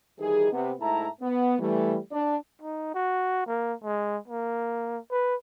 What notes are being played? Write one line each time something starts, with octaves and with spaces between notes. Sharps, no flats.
D#3 E3 G3 D#4 G#4
C3 B3
G#2 A3 E4 E5 A5 A#5
B3
E3 G3 A3
D4
D#4
F#4
A#3
G#3
A#3
B4